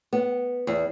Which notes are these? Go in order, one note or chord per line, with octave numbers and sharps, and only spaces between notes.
B3
E2